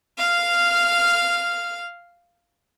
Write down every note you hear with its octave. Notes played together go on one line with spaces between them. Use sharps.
F5 F6